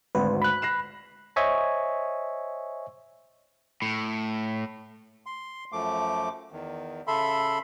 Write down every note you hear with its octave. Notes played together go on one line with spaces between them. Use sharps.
G#1 D2 B4
B5 F#6
A#6 C7 E7
C5 C#5 D#5 E5 G#5 C#6
A2
C6
F#2 F3 A3 D6
E2 D#3
C#3 A4 E5 B5 C6